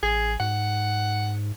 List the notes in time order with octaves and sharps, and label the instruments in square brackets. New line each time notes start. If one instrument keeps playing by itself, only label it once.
[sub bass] A1 [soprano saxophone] G#4
[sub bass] G#2 [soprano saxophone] F#5